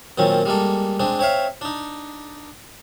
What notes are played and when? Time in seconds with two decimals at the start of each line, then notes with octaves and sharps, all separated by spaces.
0.18 F#2 A#2 D#3 C4 C#4
0.46 G3 G#3 A#3 A4
1.00 G#3 C4 D4
1.19 C4 C#5 E5 F5
1.61 D4 D#4